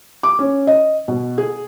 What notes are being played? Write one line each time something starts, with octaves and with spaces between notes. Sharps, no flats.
D6
C#4
D#5
B2
G#4